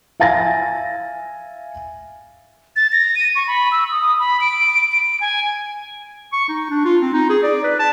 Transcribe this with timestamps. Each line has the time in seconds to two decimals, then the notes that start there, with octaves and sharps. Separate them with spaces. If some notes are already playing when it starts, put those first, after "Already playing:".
0.20 E5 F5 G#5 A6 A#6
2.76 A6
2.92 A#6
3.15 D#7
3.35 C#6
3.47 B5
3.72 E6
3.91 D#6
4.19 B5
4.41 D7
4.92 D7
5.20 G#5
6.33 C#6
6.49 D#4
6.71 D4
6.85 F4
7.02 C4
7.14 D#4
7.30 G#4
7.43 D5
7.64 B4
7.80 A5